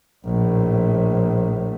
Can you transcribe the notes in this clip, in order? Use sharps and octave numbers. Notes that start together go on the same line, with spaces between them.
A#1 A2